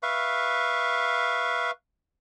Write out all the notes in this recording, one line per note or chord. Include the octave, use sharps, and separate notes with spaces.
B4 E5 F5 C#6